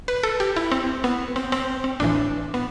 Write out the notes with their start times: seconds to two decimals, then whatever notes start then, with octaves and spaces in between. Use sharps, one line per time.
0.08 B4
0.23 A4
0.40 G4
0.56 E4
0.72 C4
1.04 B3
1.36 C4
1.52 C4
1.84 C4
2.00 A1 A2 E3 D4
2.54 B3